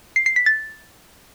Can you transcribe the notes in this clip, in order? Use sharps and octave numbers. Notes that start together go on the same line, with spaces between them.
C7
C7
B6
A6